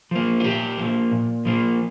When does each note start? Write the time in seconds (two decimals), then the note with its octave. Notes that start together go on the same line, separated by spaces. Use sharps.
0.11 F3 A#3
0.40 F4
0.44 A#2 G4
0.78 F3 A#3
1.11 A#2
1.45 F3 A#3